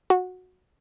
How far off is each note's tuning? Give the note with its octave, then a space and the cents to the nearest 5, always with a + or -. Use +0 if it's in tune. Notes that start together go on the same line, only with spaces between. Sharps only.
F#4 -15